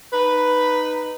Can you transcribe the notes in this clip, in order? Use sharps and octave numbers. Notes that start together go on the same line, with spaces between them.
D#4 B4